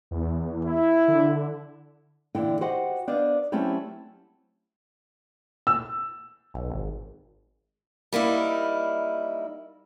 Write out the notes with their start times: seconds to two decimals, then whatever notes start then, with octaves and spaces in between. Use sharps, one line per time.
0.11 E2
0.64 E4
1.08 D3
2.35 A#2 D3 E3 E4 G5
2.61 F#4 G4 C5 D#5 F#5
3.07 B3 D4 C5 D5 D#5 F5
3.52 F#3 A3 C4 C#4 E4 G4
5.67 E6
6.54 B1
6.70 G#1
8.12 G3 A#3 D#4 E4